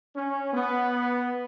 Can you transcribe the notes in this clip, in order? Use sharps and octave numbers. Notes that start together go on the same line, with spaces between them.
C#4
B3